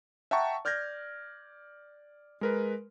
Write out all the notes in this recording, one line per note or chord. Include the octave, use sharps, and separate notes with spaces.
E5 F#5 G5 A5 A#5 C#6
D5 F6 G6 G#6 A#6
G#3 A#4 B4